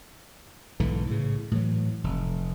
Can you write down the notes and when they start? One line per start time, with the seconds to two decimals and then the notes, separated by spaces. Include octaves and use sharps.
0.80 B1 G#2 D3 E3
1.07 A2 C#3
1.51 A2 E3 F#3
2.04 F1